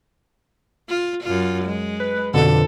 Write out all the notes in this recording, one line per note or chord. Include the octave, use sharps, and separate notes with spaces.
F4
F#2 F4
G#3
B4
F2 B2 D3 A4